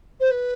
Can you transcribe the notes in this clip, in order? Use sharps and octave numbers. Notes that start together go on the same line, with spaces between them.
C5
B4